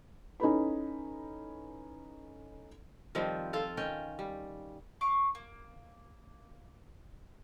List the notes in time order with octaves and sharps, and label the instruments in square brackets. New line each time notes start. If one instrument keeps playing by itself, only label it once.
[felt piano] C#4 D#4 E4 A4 B4 B5
[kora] D#3 F3 G3 C4
F4 A4 F5
D#3 C#4 G5
G3
[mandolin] F5 C#6 D6
A#3